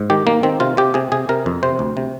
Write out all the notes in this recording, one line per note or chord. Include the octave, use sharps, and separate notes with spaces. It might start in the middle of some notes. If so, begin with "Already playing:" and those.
Already playing: G#2
D#3 G4
D#3 A#3
D#3 C4
C3 F4
C3 G4
C3 G#4
C3 G#4
C3 A#4
F2
C3 C5
D2
C3